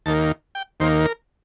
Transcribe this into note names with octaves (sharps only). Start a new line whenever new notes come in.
D#2 D#3 A#3 A5
G5
D#2 D#3 A#3 C5
A#4